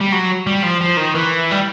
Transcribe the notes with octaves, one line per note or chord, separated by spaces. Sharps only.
G3
F#3
G3
F3
F3
D#3
E3
G3